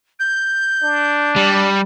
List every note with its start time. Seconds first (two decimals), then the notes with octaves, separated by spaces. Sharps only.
0.20 G6
0.83 D4
1.36 G3